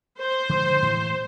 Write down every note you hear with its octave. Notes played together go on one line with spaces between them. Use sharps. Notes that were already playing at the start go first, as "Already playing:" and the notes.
C5
D3 F3 G#3
A2 E3